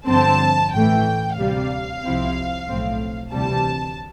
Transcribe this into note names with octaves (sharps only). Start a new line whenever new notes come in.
G2 D3 F3 C4 A5
A1 A2 E3 A3 G5
D2 C3 G3 F5
C2 C3 F3 C4 E4
B1 A2 F3 A3 C4
D2 C3 E3 G3 A5